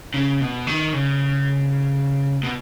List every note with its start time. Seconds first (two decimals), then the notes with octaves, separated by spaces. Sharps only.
0.14 C#3
0.41 B2
0.67 D#3
0.93 C#3
2.43 B2